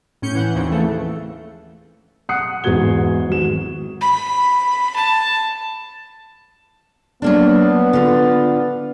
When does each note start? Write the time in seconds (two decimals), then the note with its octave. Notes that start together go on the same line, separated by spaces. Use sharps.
0.22 A2 C#4 G6 C#7
0.35 E3 F#5
0.55 D#2 C#3 F3 C4
0.67 C#3 E3 A3
2.29 F#5 D#6 F#6 C7 C#7
2.64 E2 G#2 B3 F#4 G#6 G7
3.29 G#1 F#4 E7
4.01 B5
4.96 A5
7.22 F#3 A#3 B3 D4
7.93 D3 F4